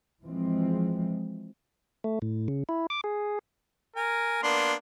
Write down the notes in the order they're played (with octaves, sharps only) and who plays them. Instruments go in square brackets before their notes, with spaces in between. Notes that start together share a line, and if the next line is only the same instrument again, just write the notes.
[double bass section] E3 F3 G#3 C4
[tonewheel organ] A3
A2
C#3
E4
D6
G#4
[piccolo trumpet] A#4 [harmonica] G#5
[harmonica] A#3 B3 D4 [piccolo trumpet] C6